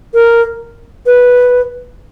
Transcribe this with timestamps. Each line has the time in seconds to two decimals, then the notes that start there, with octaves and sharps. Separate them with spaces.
0.14 A#4
1.06 B4